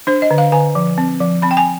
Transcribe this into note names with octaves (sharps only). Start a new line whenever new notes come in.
D4 C5
D#5
D3
F5
D3 G#5
F3
C4
F3
C4 B5
G5
G#5